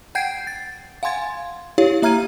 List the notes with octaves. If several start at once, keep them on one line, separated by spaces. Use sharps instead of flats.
F#5 G5 G6 G#6 C7 D7
A6
F5 F#5 G#5 C6 G#6 A6
E4 G4 C#5 F5
A#3 E5 A#5 F6 G#6 D#7